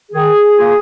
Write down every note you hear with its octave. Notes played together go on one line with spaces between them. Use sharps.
D#3 G#4
A#3 F4